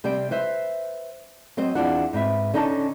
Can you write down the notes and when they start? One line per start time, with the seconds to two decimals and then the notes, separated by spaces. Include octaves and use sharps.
0.04 C3 G3 C4 G5
0.31 B4 C5 E5
1.57 F#3 C4 C5 D#5
1.75 E2 D#3 C4 D4 F4 F#5
2.13 G#2 C4 B4 E5
2.54 D3 C#4 D#4 D#5 G#5 A5